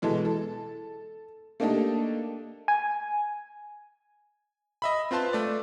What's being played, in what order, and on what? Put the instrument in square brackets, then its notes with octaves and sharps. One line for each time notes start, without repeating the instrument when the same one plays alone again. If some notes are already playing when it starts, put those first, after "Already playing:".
[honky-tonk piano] B2 E3 G#3 A4
A4
A3 A#3 D4 D#4 G4 A4
[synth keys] G#5
[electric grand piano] D#5 E5 B5
C4 F4 B4 A5 C6
A3 D5